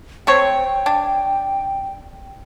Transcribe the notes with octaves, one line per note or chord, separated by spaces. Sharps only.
A3 C4 C#5 G5
D4